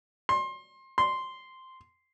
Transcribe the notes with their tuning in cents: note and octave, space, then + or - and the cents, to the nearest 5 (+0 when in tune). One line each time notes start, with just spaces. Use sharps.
C6 +25
C6 -5